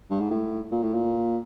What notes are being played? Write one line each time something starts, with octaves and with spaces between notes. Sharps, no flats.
G2
G#2
A2
A#2
A2
A#2